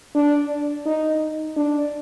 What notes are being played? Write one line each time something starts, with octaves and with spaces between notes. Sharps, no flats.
D4
D#4
D4